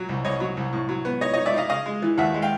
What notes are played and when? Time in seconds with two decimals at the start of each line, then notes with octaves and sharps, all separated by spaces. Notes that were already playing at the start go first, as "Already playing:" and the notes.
Already playing: A#2 F#3
0.09 C2
0.24 C2 C#5 D#5
0.40 F#3
0.57 C2
0.73 A2
0.89 F#3
1.05 B3
1.21 D#4 C#5 D#5
1.33 D#4 C#5 D#5
1.46 D5 E5
1.54 D#4 D#5 F5
1.69 C#3 D#5 F5
1.86 G#3
2.02 E3
2.18 D#2 E5 F#5
2.34 G#3
2.42 F5 G5